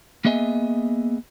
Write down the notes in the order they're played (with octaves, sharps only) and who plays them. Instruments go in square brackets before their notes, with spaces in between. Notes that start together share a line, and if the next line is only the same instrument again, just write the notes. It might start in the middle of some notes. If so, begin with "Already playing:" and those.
[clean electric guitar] A#3 B3 G#4 D#5 E5 G#5